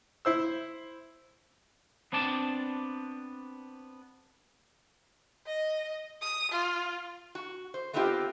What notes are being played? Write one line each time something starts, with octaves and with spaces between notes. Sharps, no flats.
E4 C5 E6
B3 C4 D4 D5 A5
D#5
D#6
F4
F#4
C5
A3 B3 C4 D#4 F4 G4